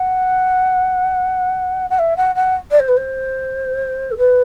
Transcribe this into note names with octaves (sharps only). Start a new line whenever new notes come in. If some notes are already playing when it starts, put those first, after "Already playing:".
Already playing: F#5
F#5
E5
F#5
F#5
D5
C5
B4
C5
A4
B4